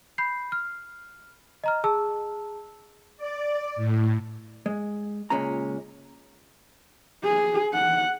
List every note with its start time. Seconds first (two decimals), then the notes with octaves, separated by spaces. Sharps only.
0.18 B5 G6 C7
0.52 F6
1.64 D#5 A#5 F6
1.84 G#4 A5 E6
3.18 D5
3.76 A2
4.66 G#3
5.30 C#2 A#2 G#3 C#4 A#5
7.24 G#4
7.73 F#5